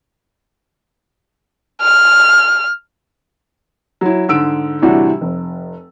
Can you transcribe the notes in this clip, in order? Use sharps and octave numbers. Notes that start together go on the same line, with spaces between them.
F6
F#3 E4
G#2 D3 E6 D7
A2 C3 E3 G3 D4 F#4
F1